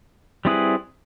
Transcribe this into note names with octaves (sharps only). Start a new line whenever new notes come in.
G3 C4 E4 G#4 B4